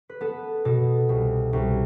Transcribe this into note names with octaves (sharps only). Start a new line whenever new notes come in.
B4
B3 A4
B2 A4
C2
C2